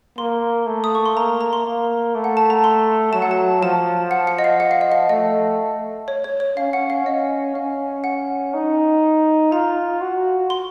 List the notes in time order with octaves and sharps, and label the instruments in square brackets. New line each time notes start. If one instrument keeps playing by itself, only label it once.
[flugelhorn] A#3 [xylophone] C6
[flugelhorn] A3
[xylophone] D#6
C#6
C6
[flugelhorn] A#3 [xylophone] A#5
[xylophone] A#5
C6
[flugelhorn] A#3
A3
[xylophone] F#5
A5
A#5
C6
[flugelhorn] F#3 [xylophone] A5
[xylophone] F#5
A5
[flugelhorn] F3 [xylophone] A5
[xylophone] F#5
F#5
D#5
F5
F#5
F5
D#5
F5
[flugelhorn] A3 [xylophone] D#5
[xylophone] C#5
C#5
C#5
[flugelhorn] C#4 [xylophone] F5
[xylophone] F#5
F5
[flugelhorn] C#4 [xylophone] D#5
[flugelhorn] C#4 [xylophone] F5
[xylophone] F#5
[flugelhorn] D#4
[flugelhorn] F4 [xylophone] A#5
[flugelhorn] F#4
[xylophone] C6